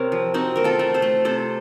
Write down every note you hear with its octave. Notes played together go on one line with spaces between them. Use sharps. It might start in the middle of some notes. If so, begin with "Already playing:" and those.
Already playing: C3 C4 A#4 C#5
F3
C4 D#4 F#4
A3 A#4
F4 A4
A3
A4 C5
A3
C3 A4 C5